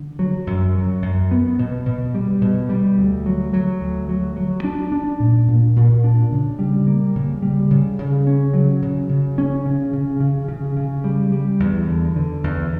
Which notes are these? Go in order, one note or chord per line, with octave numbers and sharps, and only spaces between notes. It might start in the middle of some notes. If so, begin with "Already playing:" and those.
Already playing: D3
F#3
F#2
F#3
F#2
B3
B2
B2
G3
B2
G3
D2
F#3
F#3
D2
F#3
F#3
D4
D4
A#2
A#2
A#2
D4
C#3
G3
A#3
C#3
G3
C#3
C#3
C#4
F#3
C#3
C#3
C#4
C#3
C#3
C#3
C#3
C#3
G3
G3
E2
D3
D3
E2